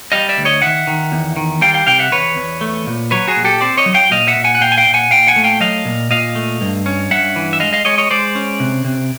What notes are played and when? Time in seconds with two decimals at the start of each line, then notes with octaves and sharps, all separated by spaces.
0.12 G3 D#5 F5
0.29 D5 E5
0.38 D2
0.45 C#5 D#5
0.62 D#3 E5 F#5
0.87 D#3
1.12 E2
1.37 D#3
1.61 G3 F5 G5
1.74 F5 G5
1.87 C3 F5 G5
1.99 E5 F#5
2.12 E2 B4 C#5
2.37 E2
2.61 A3
2.87 A#2
3.11 F#3 B4 C#5
3.28 F#4 G#4
3.36 A#2
3.45 G4 A4
3.61 C4 C5 D5
3.77 C#5 D#5
3.86 F#3
3.94 F5 G5
4.11 A#2 D#5 F5
4.28 E5 F#5
4.36 A#2
4.44 F#5 G#5
4.55 F#5
4.61 A#2 F5 G5
4.72 G#5
4.78 F5 G5
4.87 A#2
4.94 F#5 G#5
5.10 A#2 F5 G5
5.28 F#5 G#5
5.36 A3
5.44 F5 G5
5.60 F#3 D#5 F5
5.85 A#2
6.11 A#2 D#5 F5
6.35 A3
6.61 G2
6.86 C#4
7.11 G2 E5 F#5
7.36 E3
7.53 E5
7.60 G#3 D#5 F5
7.73 D#5 F5
7.85 G#3 C#5 D#5
7.98 C#5 D#5
8.11 G#3 C5 D5
8.35 C#4
8.60 C3
8.85 C3